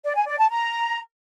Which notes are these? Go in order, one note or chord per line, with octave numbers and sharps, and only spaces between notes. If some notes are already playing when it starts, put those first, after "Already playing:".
D5
G#5
D5
A5
A#5